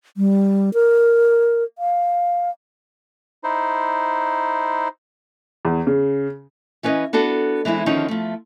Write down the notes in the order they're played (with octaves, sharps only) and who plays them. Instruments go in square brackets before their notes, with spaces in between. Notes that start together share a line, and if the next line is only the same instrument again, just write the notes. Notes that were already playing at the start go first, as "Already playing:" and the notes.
[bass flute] G3
A#4
F5
[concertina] D#4 E4 C5
[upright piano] E2
C#3
[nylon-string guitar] E3 C#4 B4 D5 D#5
B3 D4 F#4 A4
E3 G#3 C4 E4
D3 D#3 F3 C4 C#4 D#4
F3 A3